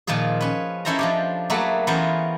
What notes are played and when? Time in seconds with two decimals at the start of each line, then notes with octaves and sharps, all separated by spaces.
0.07 A#2 D#3 F3 F4 G#4
0.41 C#4 B4
0.85 C#4 D#4 E4 A4 C5 A#5
0.99 F3 D4 G4
1.50 F#3 A3 A#3 G#4 A4 B4
1.87 E3 B3 C#4 F4 A#4 C5